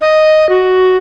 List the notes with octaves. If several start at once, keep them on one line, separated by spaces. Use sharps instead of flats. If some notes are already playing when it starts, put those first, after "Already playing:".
D#5
F#4